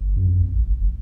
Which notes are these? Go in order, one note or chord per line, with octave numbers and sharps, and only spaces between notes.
G1
F#2
F2
A#1
A1
F1
A1